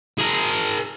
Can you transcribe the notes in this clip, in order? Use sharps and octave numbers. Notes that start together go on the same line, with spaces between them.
G#4 A#4